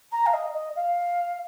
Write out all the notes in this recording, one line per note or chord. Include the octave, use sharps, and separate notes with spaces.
A#5
F5
D#5
D#5
F5